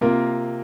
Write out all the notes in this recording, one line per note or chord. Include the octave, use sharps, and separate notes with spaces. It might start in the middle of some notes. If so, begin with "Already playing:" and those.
C3 A#3 F4 A#4